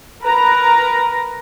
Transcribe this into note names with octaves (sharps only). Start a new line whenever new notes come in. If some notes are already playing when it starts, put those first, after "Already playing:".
A#4 B4 A#5